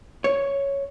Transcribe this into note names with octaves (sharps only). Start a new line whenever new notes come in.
C#5